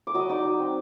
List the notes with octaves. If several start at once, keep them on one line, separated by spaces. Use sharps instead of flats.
D6
F#3 D#5 D#6
D#4 D5 D6
F#3
C4